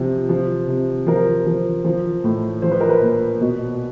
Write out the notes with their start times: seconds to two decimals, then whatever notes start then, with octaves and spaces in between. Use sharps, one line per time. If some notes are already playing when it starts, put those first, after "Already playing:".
Already playing: C3 F3
0.29 F3
0.68 C3
1.07 F3 A#4
1.46 F3
1.84 F3
2.24 A2
2.62 F3 C5
2.71 B4
2.80 A#4
2.89 B4
3.01 A#2
3.40 B2